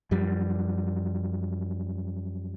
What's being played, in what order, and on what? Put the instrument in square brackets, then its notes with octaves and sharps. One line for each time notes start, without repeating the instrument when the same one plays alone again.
[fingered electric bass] F#2 F3 G3